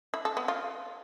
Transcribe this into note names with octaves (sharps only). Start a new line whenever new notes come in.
E4
A4
B3
F4